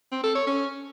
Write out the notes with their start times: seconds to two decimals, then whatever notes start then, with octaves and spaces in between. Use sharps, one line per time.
0.12 C4
0.24 A4
0.35 C#5
0.47 C#4